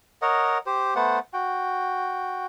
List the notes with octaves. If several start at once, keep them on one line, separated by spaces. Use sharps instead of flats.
A#4 C#5 D#5 F#5
G4 C5
A3 B3 C5 F#5
F#4 G5